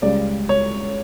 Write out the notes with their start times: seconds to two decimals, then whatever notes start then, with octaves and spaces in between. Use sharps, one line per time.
0.02 C#2 C#3 G3 D5
0.49 C#5